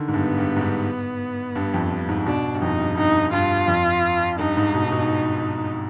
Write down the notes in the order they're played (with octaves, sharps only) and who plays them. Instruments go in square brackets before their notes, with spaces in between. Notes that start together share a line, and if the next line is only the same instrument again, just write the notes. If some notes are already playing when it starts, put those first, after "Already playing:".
Already playing: [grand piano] D3 D#3
G#2
[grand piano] G2 [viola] B3
[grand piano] G2
G#2
G2
G2
F2
G2
G#2
[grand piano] B2 [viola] D4
[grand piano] G2
[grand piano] F2 [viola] D#4
[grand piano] G2
[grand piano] G2 [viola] D#4
[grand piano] G2 [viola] F4
[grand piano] F2
[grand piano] G2 [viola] D#4
[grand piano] G#2
B2
B2